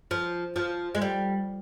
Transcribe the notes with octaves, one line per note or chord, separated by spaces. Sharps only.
F3
F3
G#3
G3